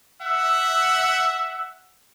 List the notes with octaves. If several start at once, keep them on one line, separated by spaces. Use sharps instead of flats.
E5 F#5